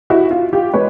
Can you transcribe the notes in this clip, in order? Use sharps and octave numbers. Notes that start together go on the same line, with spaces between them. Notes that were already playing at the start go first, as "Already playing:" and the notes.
E4 F#4
F4
F4 G4
G#3 B4 C#5